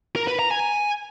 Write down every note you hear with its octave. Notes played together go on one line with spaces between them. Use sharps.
A#4
B4
A#5
G#5